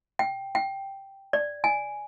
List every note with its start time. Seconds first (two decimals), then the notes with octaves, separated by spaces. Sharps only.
0.19 G5
0.55 G5
1.33 D5
1.64 G#5